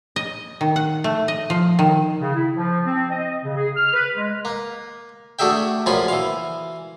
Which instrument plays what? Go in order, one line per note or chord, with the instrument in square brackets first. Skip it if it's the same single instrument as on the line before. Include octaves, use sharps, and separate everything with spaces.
[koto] D#5
D#3
F#5
A3
D#5
F3
D#3
[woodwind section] C#3
E4
F3
C4
D#5
C#3
G#4
F6
B4
G#3
[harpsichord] A#3
A3 D4 F#4 G#4 E5 G5
A#1 F#2 F3 F4 G#5 B5
E3 F5